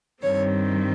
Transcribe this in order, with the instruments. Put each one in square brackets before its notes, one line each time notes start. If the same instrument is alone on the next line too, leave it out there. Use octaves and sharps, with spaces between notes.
[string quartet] G2 D#3 G3 C4 C#5